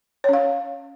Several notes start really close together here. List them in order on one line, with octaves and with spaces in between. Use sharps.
C#5 C#4 F5